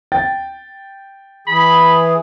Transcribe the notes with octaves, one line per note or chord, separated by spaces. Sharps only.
G5 A6
E3 G#4 B5